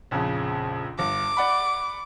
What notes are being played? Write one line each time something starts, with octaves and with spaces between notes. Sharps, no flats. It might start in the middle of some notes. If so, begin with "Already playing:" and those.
A#1 F2 C#3
G1 D6
D5 F#5 B5